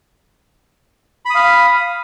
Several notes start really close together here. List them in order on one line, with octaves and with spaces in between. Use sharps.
B5 D#6 F5